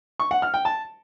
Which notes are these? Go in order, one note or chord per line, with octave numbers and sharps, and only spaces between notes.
C#6
F#5
F6
G5
A5